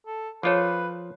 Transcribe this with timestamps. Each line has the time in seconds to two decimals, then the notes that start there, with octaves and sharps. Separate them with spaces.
0.07 A4
0.43 F3 F4 G#4 A4 B4 C#5